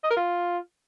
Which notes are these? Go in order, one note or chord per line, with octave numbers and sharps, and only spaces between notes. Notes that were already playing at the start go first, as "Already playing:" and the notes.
D#5
A#4
F4